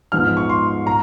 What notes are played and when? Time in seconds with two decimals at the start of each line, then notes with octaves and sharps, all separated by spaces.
0.12 G#2 F3 G#3 B3 D#4 F6
0.37 C#6
0.49 C6
0.87 A#5